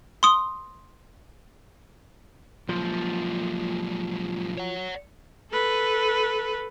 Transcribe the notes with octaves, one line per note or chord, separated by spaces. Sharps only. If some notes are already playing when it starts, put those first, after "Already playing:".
C6 D#6 G7
F#2 A#2 F3
C#5 F#5
A4 B4